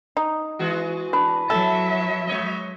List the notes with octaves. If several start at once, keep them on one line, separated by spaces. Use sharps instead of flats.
D#4
E3 G#3 F#4
D4 B4
F#3 A4 E5
G#3 C#5 D#5